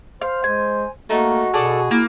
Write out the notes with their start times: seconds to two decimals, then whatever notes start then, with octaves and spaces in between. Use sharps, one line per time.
0.22 C5 F5
0.44 G#3 G#5
1.10 A3 A#3 D#4 F#4
1.54 B2 G#4 A4 D5
1.91 A#3 E4